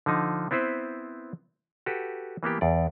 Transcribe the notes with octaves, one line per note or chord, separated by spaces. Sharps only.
D3 F3 D#4
B3 C4 E4 B4 C5
F#4 G4 A4 B4
E3 A#3 B3 G4
E2 D5